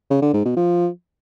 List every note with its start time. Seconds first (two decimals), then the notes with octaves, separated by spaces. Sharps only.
0.10 C#3
0.22 D3
0.33 G#2
0.45 B2
0.57 F3